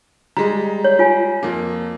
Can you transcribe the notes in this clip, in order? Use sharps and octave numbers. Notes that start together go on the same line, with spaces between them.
G3 G#3 A#5
C#5
F4 G#5
F2 A#3